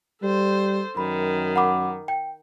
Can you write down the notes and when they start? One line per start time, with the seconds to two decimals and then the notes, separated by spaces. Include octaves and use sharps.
0.23 G3 A4 C5
0.97 F#2 D#3 B5
1.56 F#5 B5 D6
2.08 G5